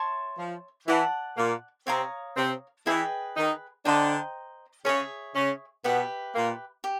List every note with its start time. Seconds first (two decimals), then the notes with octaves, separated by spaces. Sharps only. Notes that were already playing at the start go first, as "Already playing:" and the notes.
Already playing: C#5 E5 A5 C6
0.38 F3
0.87 E3 D5 F#5 A5
1.37 A#2 A#3
1.87 C3 C4 C#5 F5 A#5 D#6
2.36 C3 C4
2.86 E3 E4 G#4 B4 D#5 G5
3.36 D#3 D#4
3.85 D3 D4 C5 D#5 G5 A#5
4.85 C#3 C#4 G#4 C#5 E5
5.34 C#3 C#4
5.84 B2 B3 G4 B4 E5
6.34 A#2 A#3
6.84 G4